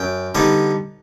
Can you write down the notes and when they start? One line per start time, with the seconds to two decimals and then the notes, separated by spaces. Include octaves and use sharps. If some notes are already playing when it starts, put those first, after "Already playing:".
Already playing: F#2 G5
0.35 D3 G3 B3 D#4